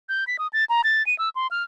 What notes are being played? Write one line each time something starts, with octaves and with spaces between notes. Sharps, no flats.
G6
B6
D#6
A6
A#5
A6
D#7
E6
C6
F6